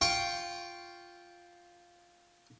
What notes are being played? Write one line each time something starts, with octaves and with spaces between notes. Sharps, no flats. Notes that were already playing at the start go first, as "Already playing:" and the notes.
F4 G5 C#6